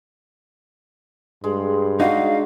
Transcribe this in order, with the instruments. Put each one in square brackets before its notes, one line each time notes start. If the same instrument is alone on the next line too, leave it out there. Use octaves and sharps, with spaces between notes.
[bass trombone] G2 [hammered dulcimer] G#3
[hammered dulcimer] G#3 D4 F#4 [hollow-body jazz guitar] D#4 [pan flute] F5